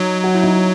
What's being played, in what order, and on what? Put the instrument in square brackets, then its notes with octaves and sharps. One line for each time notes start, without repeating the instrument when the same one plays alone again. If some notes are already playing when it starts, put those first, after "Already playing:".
Already playing: [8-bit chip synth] F#3 [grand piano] D#4
[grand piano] F#4
E4
D#4
E4